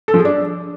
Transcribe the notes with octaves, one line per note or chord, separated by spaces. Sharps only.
A4
F3
G#4
D4